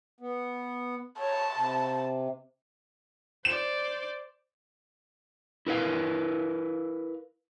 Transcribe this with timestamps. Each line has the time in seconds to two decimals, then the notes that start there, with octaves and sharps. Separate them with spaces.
0.21 B3
1.20 C#5 A5
1.57 C3
3.45 C5 D5 E7
5.67 E4 A#4 B4 F5